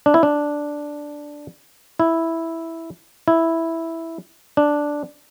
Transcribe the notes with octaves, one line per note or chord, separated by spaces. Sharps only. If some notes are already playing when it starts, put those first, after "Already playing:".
D4
E4
D4
E4
E4
D4